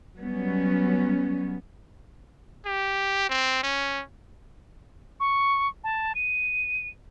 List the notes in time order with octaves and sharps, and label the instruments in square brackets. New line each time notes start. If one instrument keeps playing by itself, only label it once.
[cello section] F#3 G3 B3 C#4
[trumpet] G4
C4
C#4
[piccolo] C#6
A5
D#7